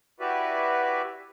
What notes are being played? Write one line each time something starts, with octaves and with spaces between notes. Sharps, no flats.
E4 F#4 G4 B4 D5 E5